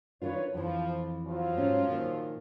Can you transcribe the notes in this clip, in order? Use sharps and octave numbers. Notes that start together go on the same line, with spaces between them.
D#3 D4 F4 B4 C#5
F2 E3 F3
F3 F#3 F4
G#2 C#4
A#2 D#3